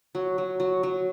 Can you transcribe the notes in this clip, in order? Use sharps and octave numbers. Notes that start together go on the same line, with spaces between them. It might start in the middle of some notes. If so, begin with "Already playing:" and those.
F#3
F#3
F#3
F#3